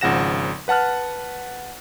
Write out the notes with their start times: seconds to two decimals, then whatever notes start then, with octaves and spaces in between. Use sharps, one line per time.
0.01 G#1 C#3 F3 F#5 A#6 E7
0.68 B4 F#5 A5 F6 F#6